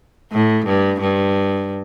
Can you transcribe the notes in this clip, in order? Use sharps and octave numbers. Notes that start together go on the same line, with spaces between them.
A2
G2
G2